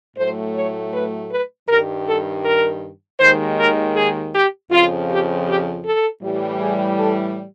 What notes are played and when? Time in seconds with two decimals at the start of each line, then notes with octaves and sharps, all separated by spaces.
0.17 A2 F#3 A3 C5
0.55 C#5
0.93 B4
1.31 B4
1.68 G2 D#3 G3 A#4
2.06 A4
2.44 A#4
3.19 D#2 D#3 G#3 C5
3.58 A#4
3.96 G#4
4.34 G4
4.71 F2 C#3 F3 F4
5.09 G4
5.47 G4
5.85 A4
6.23 A2 E3 G3
6.61 G#4
6.98 A4